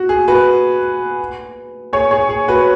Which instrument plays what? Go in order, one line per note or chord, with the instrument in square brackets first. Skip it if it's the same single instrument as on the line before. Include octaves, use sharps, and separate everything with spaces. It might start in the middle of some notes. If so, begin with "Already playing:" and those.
Already playing: [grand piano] F#4
G#4
F#4 B4
G#4 C#5
G#4 C#5
G#4
F#4 B4